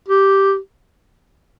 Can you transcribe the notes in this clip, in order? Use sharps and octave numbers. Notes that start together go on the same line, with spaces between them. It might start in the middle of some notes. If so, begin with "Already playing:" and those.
G4